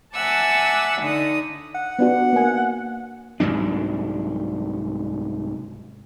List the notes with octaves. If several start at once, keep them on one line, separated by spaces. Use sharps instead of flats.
E5 F#5 G#5 A5 D6 E6
D3 D#4 D#6
F#5
B3 D4 F#4
A#3 G#5
C2 G#2 F#3 D4